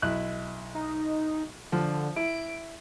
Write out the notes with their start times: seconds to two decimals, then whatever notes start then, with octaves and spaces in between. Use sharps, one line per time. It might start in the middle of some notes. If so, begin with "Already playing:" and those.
0.02 B1 E4 F#6
0.75 D#4
1.72 D3 F3
2.16 E4 D7